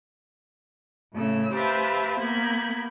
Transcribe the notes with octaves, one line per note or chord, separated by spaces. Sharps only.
A2 C#3 A3 E6
G4 B4 C5 E5 F5 A5
A#3 B3 B5 G6 G#6